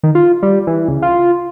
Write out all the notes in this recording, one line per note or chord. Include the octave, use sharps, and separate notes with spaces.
D#3
F4
G3
E3
C#2
F4